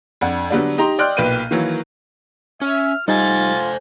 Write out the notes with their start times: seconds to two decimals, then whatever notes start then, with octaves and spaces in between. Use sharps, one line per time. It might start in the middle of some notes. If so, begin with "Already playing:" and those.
0.21 F2 D4 F#5
0.50 D3 F#3 G3 B3 D4
0.78 D#4 G4 A#5 C6
0.99 D5 D#5 G5 C6 F6 F#6
1.17 B1 A#2 B4 G5 G6 D#7
1.51 D#3 E3 F#3 A#3
2.62 C#4 E5 F6
3.08 G3 D#4 F4 A4 C5 G#5 A6